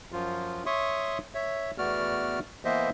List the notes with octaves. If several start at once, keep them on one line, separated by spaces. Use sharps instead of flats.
F#2 F3 F4
C#5 E5 C6 C#6 D#6
C#5 E5
E2 A3 B3 F#4 D5 F6
E3 A#3 B3 C5 D#5 E5